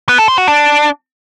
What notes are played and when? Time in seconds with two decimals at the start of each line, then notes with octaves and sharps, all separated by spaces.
0.09 B3
0.18 A4
0.28 C5
0.38 F#4
0.48 D4